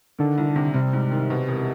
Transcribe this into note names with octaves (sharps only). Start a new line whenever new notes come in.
D3 D#3
C2
C3
C3 G3
G#2
D#3
B2
E1